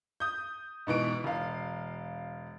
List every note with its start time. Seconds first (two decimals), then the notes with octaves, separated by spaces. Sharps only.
0.20 D#6 G6
0.87 G#2 B2 E3 D7
1.24 E1 F5